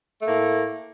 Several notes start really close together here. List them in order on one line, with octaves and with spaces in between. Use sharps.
A3 A#3 A2